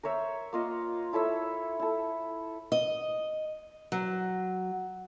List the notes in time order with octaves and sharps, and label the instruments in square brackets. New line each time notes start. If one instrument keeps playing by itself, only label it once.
[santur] A#4 C5 C#5 E5
A#3 F4 D#5
E4 A4 C#5 E5
E4 A4
[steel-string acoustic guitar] D#5
F#3